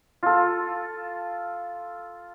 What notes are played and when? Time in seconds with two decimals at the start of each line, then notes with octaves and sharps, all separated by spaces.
0.23 F4 A4